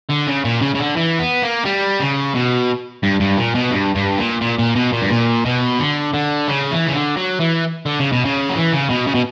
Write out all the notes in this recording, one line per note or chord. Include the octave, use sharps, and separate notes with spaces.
D3
C#3
A#2
C#3
C#3
D3
E3
B3
A#3
G3
C#3
B2
G2
G2
A#2
B2
G2
G2
A#2
A#2
A#2
B2
A#2
G2
A#2
B2
D3
D3
C#3
E3
C#3
D3
F#3
E3
D3
C#3
B2
C#3
F#3
E3
C#3
B2
C#3
B2